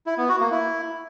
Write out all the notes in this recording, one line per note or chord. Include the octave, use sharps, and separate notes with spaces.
E4
B3
F#4
A#3
E4